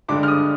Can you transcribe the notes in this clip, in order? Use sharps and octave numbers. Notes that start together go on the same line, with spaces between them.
G2 D3 G#3 D6
F6
D#6